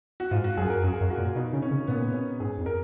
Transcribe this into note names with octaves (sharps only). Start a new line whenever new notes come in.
F#4
G#2 F4
F#4
F#2 G#4
A#4
F#2 G#4
F#2
F#4
A#2
B2 D#4
C#3
C#4
C#3
A#2 B3
C#4
G#2 G#4
F2
A#4